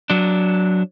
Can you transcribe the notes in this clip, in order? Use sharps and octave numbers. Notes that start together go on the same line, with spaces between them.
F#3 D4